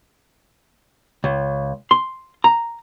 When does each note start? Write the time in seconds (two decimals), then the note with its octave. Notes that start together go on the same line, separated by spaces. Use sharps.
1.24 C#2
1.91 C6
2.44 A#5